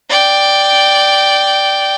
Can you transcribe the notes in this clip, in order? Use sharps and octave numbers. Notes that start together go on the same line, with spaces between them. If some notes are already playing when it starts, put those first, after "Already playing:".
D5 G5